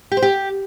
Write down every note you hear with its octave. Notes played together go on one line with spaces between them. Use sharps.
G4
C5
G4